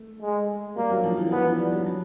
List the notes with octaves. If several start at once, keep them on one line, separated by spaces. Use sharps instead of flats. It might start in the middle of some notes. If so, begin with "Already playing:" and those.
Already playing: A3
G#3
G3 A#3
F#3
F3
E3
F3 B3
E3
G3
F#3
F#3